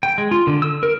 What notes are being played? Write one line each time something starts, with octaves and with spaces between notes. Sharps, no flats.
G5
G#3
F4
D3
E6
A#4